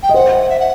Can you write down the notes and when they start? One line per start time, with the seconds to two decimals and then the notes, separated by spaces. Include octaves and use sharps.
0.03 G5
0.09 D#5
0.14 C5 F#5
0.49 E5
0.59 F#5